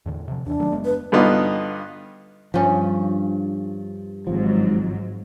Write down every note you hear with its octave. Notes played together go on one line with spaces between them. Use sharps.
E2 A2 D3
C3 F3
D#2 E3 D4
D#3 F#3 A3
F#1 G#3 B3
B4
G2 D3 B3 D#4 F4
G2 F3 C#4
G#1 G#2 F3 F#3